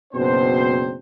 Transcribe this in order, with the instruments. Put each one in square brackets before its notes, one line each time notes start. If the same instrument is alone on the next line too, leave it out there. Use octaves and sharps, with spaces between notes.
[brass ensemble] F#1 B2 C4 D4 C5